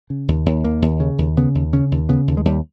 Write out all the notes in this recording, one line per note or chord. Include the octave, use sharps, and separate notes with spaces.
C#3
D#2
D#2
D#2 A#3
D#2
C#3
D#2
C#3 B3
D#2
C#3 C#4
D#2
C#3 B3
D#2
G#3
D#2 G3